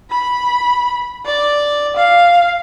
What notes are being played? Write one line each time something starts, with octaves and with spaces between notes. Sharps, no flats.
B5
D5
F5